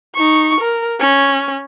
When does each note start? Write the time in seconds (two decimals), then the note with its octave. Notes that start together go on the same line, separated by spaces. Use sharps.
0.15 D#4 C#6
0.61 A#4
1.00 C#4